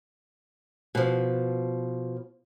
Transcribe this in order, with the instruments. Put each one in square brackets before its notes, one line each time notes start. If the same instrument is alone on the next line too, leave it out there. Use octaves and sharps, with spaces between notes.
[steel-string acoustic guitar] B2 F3